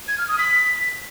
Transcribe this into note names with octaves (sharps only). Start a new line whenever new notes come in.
G#6
F6
D#6
B6